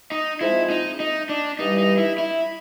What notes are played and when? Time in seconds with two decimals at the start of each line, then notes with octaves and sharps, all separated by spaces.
0.12 D#4
0.40 G#2 F3 G#3 C4 E4 F4
0.70 D#4
1.00 D#4
1.29 D4
1.59 G2 E3 G3 D#4
1.78 D#4
1.98 E4
2.18 E4